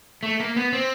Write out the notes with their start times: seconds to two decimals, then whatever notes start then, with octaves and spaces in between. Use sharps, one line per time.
0.23 A3
0.40 A#3
0.56 B3
0.73 C4